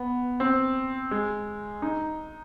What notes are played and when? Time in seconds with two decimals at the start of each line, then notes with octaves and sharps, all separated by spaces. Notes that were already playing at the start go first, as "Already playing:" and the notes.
Already playing: B3
0.40 C4
1.11 G#3
1.82 D#4